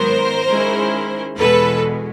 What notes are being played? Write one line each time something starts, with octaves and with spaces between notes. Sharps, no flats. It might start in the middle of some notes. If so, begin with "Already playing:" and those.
Already playing: G#2 D#3 F#3 B3 A#4 C5
D#3 G#3 C#4 E4
E2 B2 G#3 A4 B4